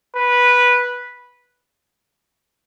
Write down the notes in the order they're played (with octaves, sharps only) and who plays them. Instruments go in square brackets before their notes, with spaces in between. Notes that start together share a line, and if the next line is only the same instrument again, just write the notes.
[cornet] B4